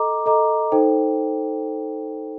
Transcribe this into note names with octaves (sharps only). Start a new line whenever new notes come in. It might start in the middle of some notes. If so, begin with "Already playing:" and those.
Already playing: A4 D#5 A#5 D6
A4 D#5 A#5 D6
D#4 A4 C5 G5